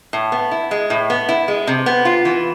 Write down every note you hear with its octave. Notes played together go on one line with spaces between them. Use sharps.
A2
B3
E4
G#3
A2
B3
E4
G#3
C3
B3
F4
E3